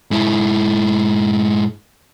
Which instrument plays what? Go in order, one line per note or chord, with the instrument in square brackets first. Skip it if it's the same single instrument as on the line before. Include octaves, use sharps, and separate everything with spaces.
[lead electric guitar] G#2 E4